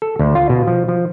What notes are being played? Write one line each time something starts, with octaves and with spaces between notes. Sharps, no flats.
A4
D2
F4
B2
F3
F3